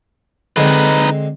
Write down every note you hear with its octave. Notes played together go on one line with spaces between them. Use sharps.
D3 G#3 C4 D#4 B4